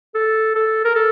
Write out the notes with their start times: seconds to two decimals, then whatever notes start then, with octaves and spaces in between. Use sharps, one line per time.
0.15 A4
0.56 A4
0.85 A#4
0.95 A4